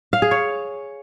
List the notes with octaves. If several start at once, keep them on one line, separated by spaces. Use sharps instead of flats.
F5
G#4
C#5